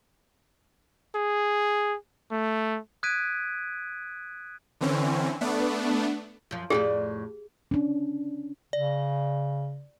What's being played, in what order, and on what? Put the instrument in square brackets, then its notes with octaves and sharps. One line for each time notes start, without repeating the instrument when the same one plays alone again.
[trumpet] G#4
A3
[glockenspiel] D#6 F#6 G#6 B6 D7 D#7
[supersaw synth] D3 E3 C4 C#4
A3 B3 D4
[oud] F#2 F3
[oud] F2 A2 D5 [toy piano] G4 G#4
[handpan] C#4 D4
[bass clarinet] C#3 [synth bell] D5